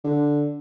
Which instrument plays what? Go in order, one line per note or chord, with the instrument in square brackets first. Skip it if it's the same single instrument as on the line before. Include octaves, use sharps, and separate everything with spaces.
[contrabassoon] D3